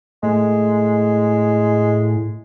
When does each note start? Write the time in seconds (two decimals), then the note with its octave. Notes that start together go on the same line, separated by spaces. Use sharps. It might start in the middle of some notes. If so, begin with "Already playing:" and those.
0.23 A2 G#3